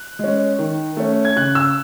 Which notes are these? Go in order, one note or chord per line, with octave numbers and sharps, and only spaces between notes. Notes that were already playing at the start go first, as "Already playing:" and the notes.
Already playing: F#6
G#3 C#4
D#3
A3 C#4
G#6
C#3 F#6
E6